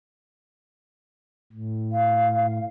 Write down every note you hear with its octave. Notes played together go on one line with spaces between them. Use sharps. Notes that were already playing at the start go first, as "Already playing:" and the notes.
A2
F5